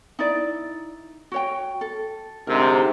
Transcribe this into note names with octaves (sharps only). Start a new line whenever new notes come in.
D#4 E4 D5
F#4 C#5 G5
A4
D2 G#2 C3 A#4